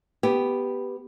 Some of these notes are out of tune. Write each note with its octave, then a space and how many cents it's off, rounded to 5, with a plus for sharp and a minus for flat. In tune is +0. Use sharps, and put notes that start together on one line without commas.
B3 +0 G4 +0